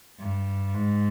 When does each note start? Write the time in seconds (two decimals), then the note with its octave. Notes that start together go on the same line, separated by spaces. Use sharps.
0.20 G2
0.74 G#2